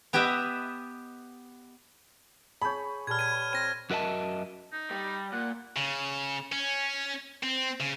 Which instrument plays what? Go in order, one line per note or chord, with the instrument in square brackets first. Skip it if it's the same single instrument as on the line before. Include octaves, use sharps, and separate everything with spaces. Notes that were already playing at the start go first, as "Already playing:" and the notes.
[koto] B3 G4 B4 D#5 E5
[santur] G#4 C#5 [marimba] A5 G6 [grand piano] B5
[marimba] A#2 [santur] G3 A4 B4 [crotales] F6 G#6
[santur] B4 [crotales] G#6 D#7
[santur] C4 C5 [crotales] A#6 D#7
[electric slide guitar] F#2 F#4 A#4 D#5 E5 A5
[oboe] D#4
[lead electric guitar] G3
[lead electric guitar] A#2 [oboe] F#5
[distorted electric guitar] C#3
C#4
C4
C#3